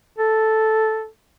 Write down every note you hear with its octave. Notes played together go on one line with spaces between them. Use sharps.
A4